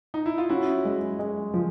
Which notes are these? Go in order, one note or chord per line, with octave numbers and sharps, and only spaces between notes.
D#4
E4
F4
C#4 E4 F#4
G#3
G#3
F3